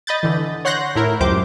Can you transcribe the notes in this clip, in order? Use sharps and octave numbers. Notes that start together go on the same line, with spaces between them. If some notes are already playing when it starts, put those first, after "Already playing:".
D#5 B5 G6 A6
D3 E3
C#5 F#5 C6 F#6 G6 A#6
A2 E4 A#4
C#2 F#2 G4 C5 D6 G6